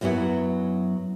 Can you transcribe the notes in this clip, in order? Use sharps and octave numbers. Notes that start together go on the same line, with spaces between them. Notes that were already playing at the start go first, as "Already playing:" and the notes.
F#2 F#3 B3 E4 F#4